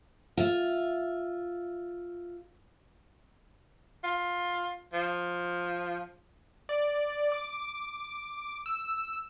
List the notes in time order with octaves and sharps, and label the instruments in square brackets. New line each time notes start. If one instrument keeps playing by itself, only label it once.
[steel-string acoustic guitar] F4 E5
[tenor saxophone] F4
F3
[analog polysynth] D5
D6
E6